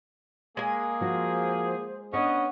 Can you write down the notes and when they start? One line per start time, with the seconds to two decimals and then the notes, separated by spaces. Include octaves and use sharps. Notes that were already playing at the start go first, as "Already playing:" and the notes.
0.57 G#3 A#3 G#4 G#5
1.01 F3 F#4 C5
2.13 B3 C#4 D4 C#5 D#5 F#5